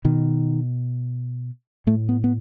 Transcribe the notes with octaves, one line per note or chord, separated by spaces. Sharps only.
B2 D#3
A2 A3
B3
B3